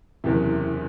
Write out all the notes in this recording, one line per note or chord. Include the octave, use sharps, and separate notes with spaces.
F#1 E2 C3